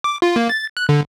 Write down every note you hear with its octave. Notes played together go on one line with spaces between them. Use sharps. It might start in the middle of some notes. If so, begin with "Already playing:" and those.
D6
F4
A#3
A6
F#6
D3